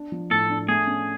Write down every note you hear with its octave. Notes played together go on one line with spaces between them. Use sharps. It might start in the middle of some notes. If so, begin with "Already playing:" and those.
Already playing: D4
F3
A2 A4
D4
A3 G#4
C#4